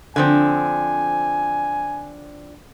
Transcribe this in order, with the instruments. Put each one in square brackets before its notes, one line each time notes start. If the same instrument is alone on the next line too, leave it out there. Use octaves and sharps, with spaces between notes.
[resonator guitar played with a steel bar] D3 F3 C4 [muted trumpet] G#5